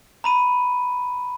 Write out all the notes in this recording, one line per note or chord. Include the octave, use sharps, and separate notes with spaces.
A#5 B5 D#7